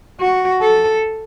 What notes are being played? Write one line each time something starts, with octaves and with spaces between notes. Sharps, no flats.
F#4
A4